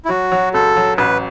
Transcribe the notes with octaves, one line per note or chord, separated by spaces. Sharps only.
E4
F#3 F#4
F#3
C#2 A4
F#3
A1 B4